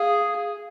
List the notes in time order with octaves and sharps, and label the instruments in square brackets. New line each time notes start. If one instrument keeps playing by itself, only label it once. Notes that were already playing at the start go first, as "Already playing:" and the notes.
Already playing: [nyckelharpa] G#4 [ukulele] F5